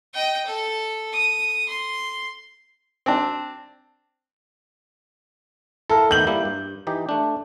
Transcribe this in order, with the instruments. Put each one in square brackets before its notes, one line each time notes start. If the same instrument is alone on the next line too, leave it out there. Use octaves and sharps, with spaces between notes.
[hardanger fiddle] D#5 G5
A4
D#6
C6
[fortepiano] C4 D4
[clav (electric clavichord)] E4 A#4 F5 [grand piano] A4
[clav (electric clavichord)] D#3 A3 B3 [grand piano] G6 F#7
[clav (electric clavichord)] G3 A#3 E4
G2
E3 D#4 G4
A3 D4